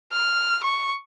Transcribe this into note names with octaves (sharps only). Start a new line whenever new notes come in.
F6
C#6